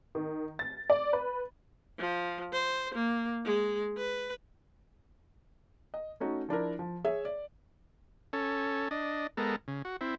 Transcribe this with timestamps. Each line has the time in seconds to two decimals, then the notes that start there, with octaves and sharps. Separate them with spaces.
0.15 D#3
0.59 A6
0.90 D5
1.13 B4
1.98 F3
2.53 C5
2.95 A#3
3.45 G#3
3.97 B4
5.94 D#5
6.20 A3 C#4 D#4 F#4
6.49 F3 D4 E4 A#4
6.79 F3
7.04 G#4 C#5 E5
7.25 D5
8.33 C#4 A4
8.91 D4 D#5
9.37 G#3 B3 A4 A#4
9.68 C#3
9.85 F#4
10.01 C4 E4